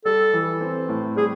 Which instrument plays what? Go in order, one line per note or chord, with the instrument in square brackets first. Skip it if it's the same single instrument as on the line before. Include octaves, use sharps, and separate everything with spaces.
[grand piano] G3 [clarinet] A4
[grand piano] E3
C4
A2
[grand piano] G3 [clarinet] G#4